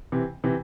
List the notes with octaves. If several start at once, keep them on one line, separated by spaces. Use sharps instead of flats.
C3 E3
C3 E3